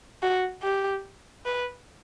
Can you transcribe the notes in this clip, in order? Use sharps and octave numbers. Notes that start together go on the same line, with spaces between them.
F#4
G4
B4